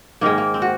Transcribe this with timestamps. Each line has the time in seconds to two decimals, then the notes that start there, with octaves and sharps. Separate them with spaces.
0.21 G#2 D#3 G#3 A#3
0.38 A#3
0.54 C4
0.62 F#4